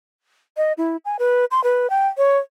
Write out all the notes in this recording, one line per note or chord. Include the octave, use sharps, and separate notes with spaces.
D#5
E4
G#5
B4
C6
B4
G5
C#5